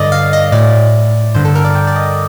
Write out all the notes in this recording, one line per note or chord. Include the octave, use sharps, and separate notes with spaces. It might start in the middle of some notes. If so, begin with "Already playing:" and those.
Already playing: G2 D3 D5 D#5
F5
D#5
A2 D5
G2 D3 C5
A4
A#4
D5
G5
D5
D#5